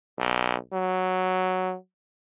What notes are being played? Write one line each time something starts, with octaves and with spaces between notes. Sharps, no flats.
B1
F#3